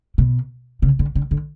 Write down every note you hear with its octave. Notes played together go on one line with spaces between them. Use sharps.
B2
C#3
D3
D3
D3